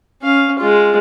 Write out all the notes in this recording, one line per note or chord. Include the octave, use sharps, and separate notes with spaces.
C#4 F5
G#3 F4